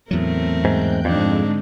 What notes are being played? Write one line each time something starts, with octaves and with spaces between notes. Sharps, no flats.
E2 A2 F#3 A3 C4 A#4
G#2 G5 F#6 G6
F2 G#2 D3 G#3 C4 D4 D#4